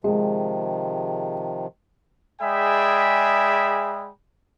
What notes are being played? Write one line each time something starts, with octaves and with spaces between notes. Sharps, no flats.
C3 D#3 F3 G#3
G#3 G#4 D5 E5 G5 B5